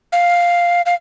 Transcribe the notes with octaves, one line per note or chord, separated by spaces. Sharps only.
F5
F5